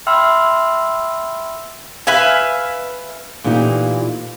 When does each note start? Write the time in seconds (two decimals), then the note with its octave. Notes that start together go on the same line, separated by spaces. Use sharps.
0.07 E5 G5 B5 C6 E6 F6
2.07 B4 E5 F5 G#5
3.44 A#2 E3 A3 D#4 G4